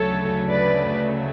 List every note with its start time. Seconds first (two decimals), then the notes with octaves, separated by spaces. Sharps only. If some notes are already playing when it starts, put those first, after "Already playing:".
Already playing: D2 C#3 F#3 A3 A4 C#5
0.50 B4 D5